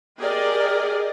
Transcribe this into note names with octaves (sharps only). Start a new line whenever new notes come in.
G4 G#4 A#4 D5 D#5